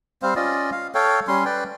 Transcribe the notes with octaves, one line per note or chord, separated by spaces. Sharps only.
G3 C4 C5 F5
C#4 F4 D5 D#5
F5
A4 C#5 F5 G5
G3 C#4 C6
B4 D5 G5